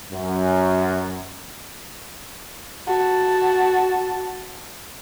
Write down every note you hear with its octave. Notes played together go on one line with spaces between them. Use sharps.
F#2
F#4 A5